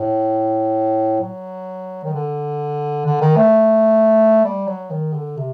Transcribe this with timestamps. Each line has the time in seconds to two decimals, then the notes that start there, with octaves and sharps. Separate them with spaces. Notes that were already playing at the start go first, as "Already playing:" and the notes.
Already playing: A2
1.21 F#3
2.04 D#3
2.13 D3
3.06 D3
3.21 D#3
3.36 A3
4.45 G3
4.67 F#3
4.90 D#3
5.13 D3
5.37 C3